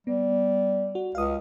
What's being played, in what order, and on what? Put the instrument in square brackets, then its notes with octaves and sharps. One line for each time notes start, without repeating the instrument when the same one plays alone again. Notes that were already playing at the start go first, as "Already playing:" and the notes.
[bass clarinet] G3 [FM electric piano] B3
[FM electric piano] F#4
[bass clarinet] C#2 [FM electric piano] F5 D#6